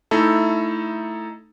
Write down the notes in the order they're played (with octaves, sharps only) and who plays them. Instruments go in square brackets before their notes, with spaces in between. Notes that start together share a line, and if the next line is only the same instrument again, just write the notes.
[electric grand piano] A3 D#4 E4 A4